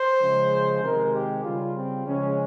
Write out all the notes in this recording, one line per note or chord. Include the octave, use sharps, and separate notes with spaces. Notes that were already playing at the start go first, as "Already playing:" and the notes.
Already playing: C5
C#3 F3 G#3
C3 D#3 G#3 A#4
G4
C#3 G3 F4
C4
C#3 F3 G#3 C#4